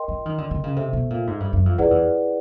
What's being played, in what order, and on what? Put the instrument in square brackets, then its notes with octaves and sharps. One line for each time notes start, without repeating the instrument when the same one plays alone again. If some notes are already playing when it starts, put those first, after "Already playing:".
Already playing: [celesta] A#4 D#5 G5 C6
[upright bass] F3
D#3
D3
D3
C#3
[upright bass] C3 [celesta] A4 C5 E5
[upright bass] B2
A#2
G#2
G2
F#2
F2
[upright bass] F2 [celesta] E4 G#4 B4 D5 F#5
[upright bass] E2